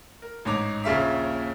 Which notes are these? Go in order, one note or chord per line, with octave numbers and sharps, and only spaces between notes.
A#4
A1 G#2 D#4 C#5 A#5 D6
A#1 D#2 C#3 F4 E5 B6